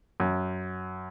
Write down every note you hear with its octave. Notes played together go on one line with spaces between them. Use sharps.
F#2